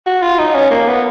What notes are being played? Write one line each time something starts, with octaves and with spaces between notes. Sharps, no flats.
F#4
F4
D#4
C#4
A#3
B3